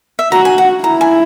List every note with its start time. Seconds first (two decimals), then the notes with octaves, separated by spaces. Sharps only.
0.19 E5
0.32 F#4 A#5
0.45 G#5
0.58 F#5
0.84 E4 A#5
1.01 G#5